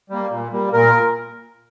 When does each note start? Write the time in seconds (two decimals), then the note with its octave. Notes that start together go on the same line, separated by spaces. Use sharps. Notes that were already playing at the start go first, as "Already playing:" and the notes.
0.10 G3 A#3
0.31 A#2
0.52 G3 A#3
0.73 A#2 A#4